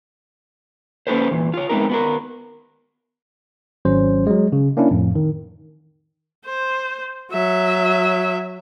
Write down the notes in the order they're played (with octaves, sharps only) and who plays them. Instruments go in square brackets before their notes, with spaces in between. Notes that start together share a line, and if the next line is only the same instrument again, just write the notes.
[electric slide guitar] A#3 C#4 G4 A4 B4 C5
E2 A#2
F4 C#5
G#3 A3 B3 C4 D#4 A#4
B3 F#4 A#4
[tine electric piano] G#1 F#3 C#4 C5
F#3 G#3
C#3
A#3 C#4 D4 E4
F2 A2
D#3
[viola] C5
F#3 E5